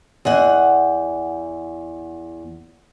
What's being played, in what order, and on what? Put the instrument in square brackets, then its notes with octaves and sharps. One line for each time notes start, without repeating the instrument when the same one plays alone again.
[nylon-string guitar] E2 D#5 F#5